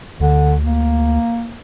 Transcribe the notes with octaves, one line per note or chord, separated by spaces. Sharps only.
D2 D3
A#3